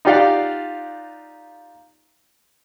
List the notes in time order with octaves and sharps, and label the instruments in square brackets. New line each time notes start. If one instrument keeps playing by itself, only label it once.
[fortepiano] D#4 F4 G4 D5 F5 F#5